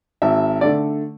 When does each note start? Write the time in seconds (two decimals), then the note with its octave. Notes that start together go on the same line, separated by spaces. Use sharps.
0.22 G#1 E5
0.61 D3 A3 D5